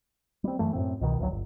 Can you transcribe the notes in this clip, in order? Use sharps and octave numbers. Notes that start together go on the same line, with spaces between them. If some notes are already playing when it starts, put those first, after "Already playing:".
G3 C4
F#2 E3 A3
F#2 A2 C4
C2 B2 D#3
D1 A1 D2 F#3
G1